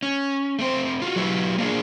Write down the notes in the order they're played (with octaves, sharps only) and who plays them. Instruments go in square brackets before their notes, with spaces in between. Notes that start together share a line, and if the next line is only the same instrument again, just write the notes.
[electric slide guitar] C#4
A3 C4 C5
F4 F#4
F#3 D4 E4 G4 B4
A#3 C#4 D4 E4 F4 G#4